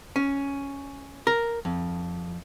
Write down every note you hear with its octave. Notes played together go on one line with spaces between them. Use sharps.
C#4
A#4
F2